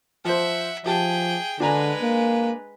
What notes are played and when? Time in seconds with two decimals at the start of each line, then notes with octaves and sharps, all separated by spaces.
0.25 F3 C5 E5 F#5
0.86 F3 G4 G#4 G5 A5
1.60 D3 G#3 D4 B4 G#5 A#5
2.02 A#3